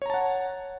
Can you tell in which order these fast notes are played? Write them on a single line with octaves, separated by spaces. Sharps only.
C#5 A#5 A5 F#5